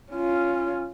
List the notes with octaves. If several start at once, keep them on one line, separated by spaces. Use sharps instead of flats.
C#4 F4